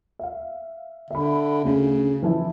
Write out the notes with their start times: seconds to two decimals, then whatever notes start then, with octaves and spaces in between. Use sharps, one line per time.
0.19 E5 F5
1.11 D3 E5 B5
1.65 D2 C#3
2.22 E3 F3 E4